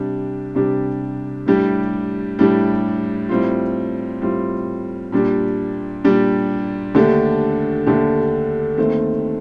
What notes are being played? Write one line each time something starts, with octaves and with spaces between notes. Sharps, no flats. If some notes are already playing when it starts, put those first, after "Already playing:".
Already playing: C3 G3 D4 G4
C3 G3 D4 G4
A2 G3 D4 G4
A2 G3 D4 G4
A2 G3 C4 F4
A2 G3 C4 F4
A#2 G3 D4 G4
A#2 G3 D4 G4
D#2 D3 A3 D4 G4
D#2 D3 A3 D4 G4
D#2 D#3 A3 C4